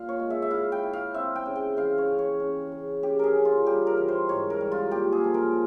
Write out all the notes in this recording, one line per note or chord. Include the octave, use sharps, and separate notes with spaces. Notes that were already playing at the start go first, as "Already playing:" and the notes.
Already playing: A#2 F5
C#5
G#3
E5
E5
E4 F5
G5
E4
F5
C4 E5
G5
C#3
G5
E3 F5
C#5
C#3
C#5
C#3
C#3
C#3 G4
G#4 A#4
C#3
F4
G3 G4
A#4
E3
C5
G#2 C#5
A#4
G3
F4
A#2 G4
G#4
F3
A#4